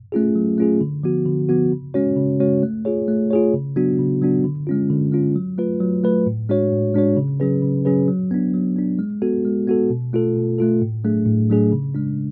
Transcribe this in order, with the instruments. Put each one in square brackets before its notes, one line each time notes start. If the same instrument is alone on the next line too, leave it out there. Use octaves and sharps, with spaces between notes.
[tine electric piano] A3 C#4 F4 G#4
F#3
A3 C#4 F4 G#4
D3
F3 B3 F#4
D3
F3 B3 F#4
C#3
G#3 C#4 F#4 C#5
C#3
G#3 C#4 F#4 C#5
A3
F4 G#4 C#5
A3
F4 G#4 C#5
C#3
F#3 B3 D4 F#4
C#3
F#3 B3 D4 F#4
D3
G#3 C#4 F4
D3
G#3 C#4 F4
F#3
A3 F4 B4
F#3
A3 F4 B4
A2
G#3 D4 F#4 C#5
A2
G#3 D4 F#4 C#5
C#3
F#3 C#4 G#4 B4
C#3
F#3 C#4 G#4 B4
F#3
B3 D4
F#3
B3 D4
G#3
B3 F#4 A4
G#3
B3 F#4 A4
B2
A3 F4 A4
B2
A3 F4 A4
A2
F#3 A3 D4 G#4
A2
F#3 A3 D4 G#4
C#3
G#3 D4